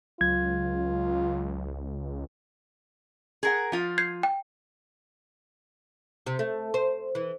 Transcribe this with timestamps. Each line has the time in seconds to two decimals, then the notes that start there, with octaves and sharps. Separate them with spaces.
0.21 C#2 F#3 F4 G#6
3.43 G#4 A#4 F#5
3.72 F3 F4
3.98 G6 G#6 C7
4.23 G5
6.26 C3
6.39 A3
6.74 C5
7.15 E3